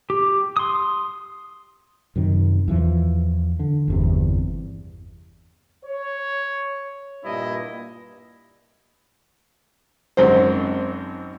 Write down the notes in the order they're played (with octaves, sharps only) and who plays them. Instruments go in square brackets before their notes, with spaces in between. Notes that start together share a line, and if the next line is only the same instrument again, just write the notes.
[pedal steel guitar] G4
C6 D#6
[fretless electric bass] F#2 C3 D#3
E2 E3 F3
D3
G1 E2 C3
[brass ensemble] C#5
G2 A#2 D4 E4 D#5
[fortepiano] G#1 F#2 C4 C5